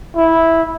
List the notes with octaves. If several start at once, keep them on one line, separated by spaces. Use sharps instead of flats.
E4